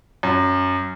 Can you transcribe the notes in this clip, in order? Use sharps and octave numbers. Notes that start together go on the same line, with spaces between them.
F#2